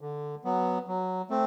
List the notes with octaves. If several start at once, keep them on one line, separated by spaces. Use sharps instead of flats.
D3
F#3 B3
F#3
A3 C4